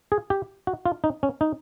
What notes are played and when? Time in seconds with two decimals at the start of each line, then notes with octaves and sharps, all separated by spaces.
0.12 G#4
0.30 G4
0.67 F#4
0.86 F4
1.04 D#4
1.23 C#4
1.41 D#4